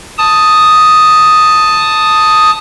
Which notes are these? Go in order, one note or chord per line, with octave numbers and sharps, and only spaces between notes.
A5 D#6